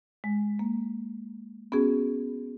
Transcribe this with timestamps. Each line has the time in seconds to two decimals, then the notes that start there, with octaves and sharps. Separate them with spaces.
0.24 G#3
0.59 A#3
1.72 B3 C#4 F#4 G#4